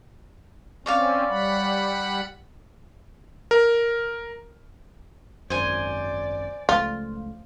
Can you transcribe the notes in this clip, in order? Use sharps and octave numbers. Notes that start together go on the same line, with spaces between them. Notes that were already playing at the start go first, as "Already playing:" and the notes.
C4 C#4 C#5 D5 F5
G3 F#5 B5
A#4
G#1 F#2 C5 D5 G#5
C#2 F3 A3 F4